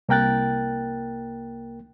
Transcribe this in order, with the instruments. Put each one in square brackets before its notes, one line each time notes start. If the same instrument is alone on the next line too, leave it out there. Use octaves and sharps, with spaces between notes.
[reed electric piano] C2 A#3 A#4 G5 F#6 A6